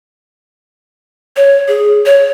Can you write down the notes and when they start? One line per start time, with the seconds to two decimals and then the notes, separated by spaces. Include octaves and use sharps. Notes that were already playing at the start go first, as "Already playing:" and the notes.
1.36 C#5
1.68 G#4
2.06 C#5